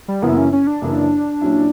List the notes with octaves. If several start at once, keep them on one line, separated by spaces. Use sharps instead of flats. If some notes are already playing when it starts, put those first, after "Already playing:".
G3
F#2 C#3 E3 A#3 B3 E4
C#4
C#4
D4
F#2 C#3 E3 A#3 E4
A#2 F#3 C#4 E4